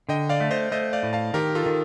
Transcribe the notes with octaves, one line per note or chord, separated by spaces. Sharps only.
D3 D#5 G5
D5 F5
A3
C5 D#5
A3 C5 D#5
D5 F5
A2
F5 A5
D#3 G4 A#4
F4 A4
D#3